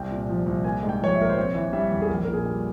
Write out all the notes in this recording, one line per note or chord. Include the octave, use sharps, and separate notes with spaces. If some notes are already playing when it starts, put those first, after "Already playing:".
Already playing: C2 G5
A#2
F3
C2
A#3 G#5
G#2
G5
F3 C#5
E5
A#1 A#4
C5
C4 C#5
E3
G3 E5
E2
G#4
A#1 A#4
A#2 A#4
G#4
G3